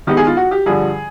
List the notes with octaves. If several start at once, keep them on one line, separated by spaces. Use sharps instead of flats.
D#3 G#3 B3 D#4 G4
G#4
F4
F#4
G4
G2 D3 F3 G#4